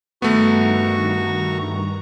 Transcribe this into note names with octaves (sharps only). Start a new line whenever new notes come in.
G2 D#3 A3 B3 F#4 A#5 C#6